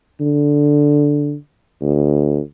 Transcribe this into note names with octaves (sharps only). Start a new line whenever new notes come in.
D3
D2